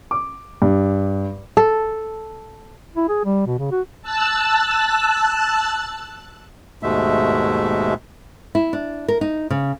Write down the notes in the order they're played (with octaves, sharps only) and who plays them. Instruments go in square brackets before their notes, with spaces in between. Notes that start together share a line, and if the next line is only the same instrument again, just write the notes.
[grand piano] D6
G2
[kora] A4
[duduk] E4
G#4
G3
B2
C#3
F#4
[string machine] A5 E6 F#6
[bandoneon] D#2 G#2 B2 G#3 A3 E5
[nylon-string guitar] E4
D4
A#4
D#4
C#3